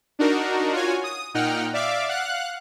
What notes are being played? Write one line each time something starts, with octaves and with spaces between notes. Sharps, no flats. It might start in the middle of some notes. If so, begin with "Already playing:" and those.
D4 D#4 F#4 A#4
F4 F#4 C#5 G#5
D#6
A#2 D#4 F#5 G5 F6
D5 E5 F5 D6
F5 F#5 F#6